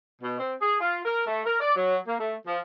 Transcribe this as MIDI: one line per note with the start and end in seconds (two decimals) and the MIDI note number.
0.22 0.37 47
0.40 0.55 60
0.62 0.76 68
0.81 1.00 65
1.06 1.23 70
1.27 1.42 57
1.45 1.57 70
1.60 1.76 74
1.76 1.97 54
2.07 2.18 58
2.19 2.36 57
2.47 2.59 53